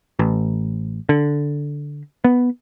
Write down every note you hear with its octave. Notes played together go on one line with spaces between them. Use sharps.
A1
D3
B3